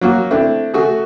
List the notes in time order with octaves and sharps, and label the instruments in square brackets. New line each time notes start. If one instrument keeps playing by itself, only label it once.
[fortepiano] F#3 A#3 F#4
A3 C4 D4 E4
A3 F#4 G#4